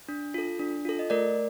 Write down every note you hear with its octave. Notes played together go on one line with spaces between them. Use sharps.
D4
F4 A4
D4
F4 A4
D#5
A3 A#4 D5